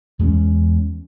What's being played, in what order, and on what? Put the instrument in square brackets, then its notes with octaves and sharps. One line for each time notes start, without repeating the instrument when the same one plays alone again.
[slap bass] E2 G#3 A3 C#4